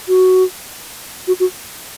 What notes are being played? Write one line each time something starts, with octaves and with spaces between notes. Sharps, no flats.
F#4
F#4
F#4